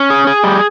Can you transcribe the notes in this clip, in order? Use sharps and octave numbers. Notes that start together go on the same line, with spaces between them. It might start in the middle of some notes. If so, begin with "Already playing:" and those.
Already playing: C#4
G#4
G#4
G3